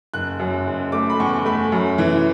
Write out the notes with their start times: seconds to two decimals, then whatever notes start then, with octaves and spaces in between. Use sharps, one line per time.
0.14 F#1 F#6
0.39 F#2
0.66 F#1
0.92 A3 D6
1.10 B5
1.20 E2 C#6
1.45 A3 B5
1.72 F#2
1.98 E3